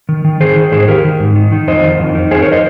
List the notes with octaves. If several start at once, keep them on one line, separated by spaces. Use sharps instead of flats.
D#3
D#3
D#3 G#4 C5
D#3
G#2 G#4 C5
D#3 G4 A#4
D#3
G#2
D#3
D#3
F2 C5 D#5
D#3
F2
D#3
F2 G#4 C5
A#4 C#5
C5 D#5